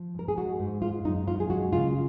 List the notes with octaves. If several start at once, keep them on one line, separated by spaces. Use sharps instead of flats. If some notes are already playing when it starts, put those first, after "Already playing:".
Already playing: F3
G#2 A#4
G#4
G#3 F#4
G#2
G#3 F4
F#2 D#4
F#2 F4
G#4
G#3 F#4
C#3 F4